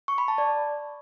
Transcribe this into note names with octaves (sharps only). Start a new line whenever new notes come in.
C#6
B5
A5
D5